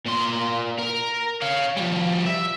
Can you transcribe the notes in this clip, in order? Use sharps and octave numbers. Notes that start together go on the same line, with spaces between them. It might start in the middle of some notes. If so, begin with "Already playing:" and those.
A#2 C6
A#4
C#5 F5
F3 G3
E5